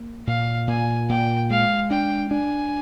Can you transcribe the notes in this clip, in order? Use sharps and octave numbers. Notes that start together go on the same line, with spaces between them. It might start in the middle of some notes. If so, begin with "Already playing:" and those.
Already playing: A#3
A#2 F5
A#2 G#5
A#2 G5
G#3 F5
D4 G5
D4 G#5